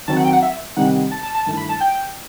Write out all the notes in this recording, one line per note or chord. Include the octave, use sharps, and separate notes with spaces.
D#3 F#3 C4 A5
F#5
G5
F#5
E5
C3 D#3 G3 C4 D#4 F#5
A5
A5
A5
G2 D#3 A3 E4 A5
B5
A5
G5